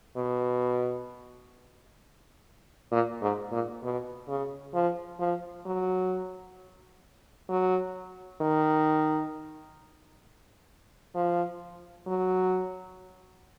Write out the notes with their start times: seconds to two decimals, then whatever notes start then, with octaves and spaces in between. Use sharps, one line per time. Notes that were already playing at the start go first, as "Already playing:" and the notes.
0.17 B2
2.92 A#2
3.22 G#2
3.52 A#2
3.83 B2
4.28 C#3
4.74 F3
5.20 F3
5.66 F#3
7.50 F#3
8.41 D#3
11.15 F3
12.07 F#3